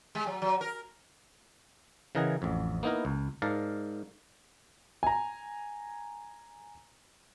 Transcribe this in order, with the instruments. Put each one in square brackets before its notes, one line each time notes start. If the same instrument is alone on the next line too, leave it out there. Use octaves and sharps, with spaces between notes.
[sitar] G#3
F#3
F#3
A#4
[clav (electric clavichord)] C#3 E3 A#4 D#5 F#5 G#5
A1 F2
A#3 B3 D#4 E4 A#4
C#2
G#2 A#4 D5 F5 A5
[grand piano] G#5 A#5